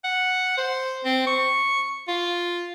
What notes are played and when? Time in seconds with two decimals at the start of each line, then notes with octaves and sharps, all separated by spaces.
0.04 F#5
0.58 C5
1.05 C4
1.27 C#6
2.08 F4